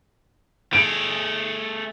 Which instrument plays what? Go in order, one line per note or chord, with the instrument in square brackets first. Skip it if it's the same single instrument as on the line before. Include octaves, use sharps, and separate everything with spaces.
[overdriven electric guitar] A3 G#4 [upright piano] D7